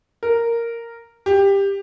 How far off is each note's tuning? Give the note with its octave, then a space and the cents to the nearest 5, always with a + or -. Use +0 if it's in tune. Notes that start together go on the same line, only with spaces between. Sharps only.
A#4 -5
G4 +15